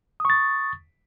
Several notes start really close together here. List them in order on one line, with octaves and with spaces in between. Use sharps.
D#6 C#6 A6